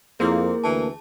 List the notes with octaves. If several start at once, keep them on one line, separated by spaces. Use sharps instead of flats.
F2 A#3 C4 E4 G#4
D2 E3 A5